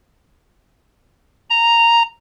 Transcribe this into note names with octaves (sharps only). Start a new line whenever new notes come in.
A#5